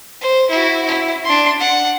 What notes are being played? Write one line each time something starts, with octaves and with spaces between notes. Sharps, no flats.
C5
E4 F#4
E4
D4 C6
F#5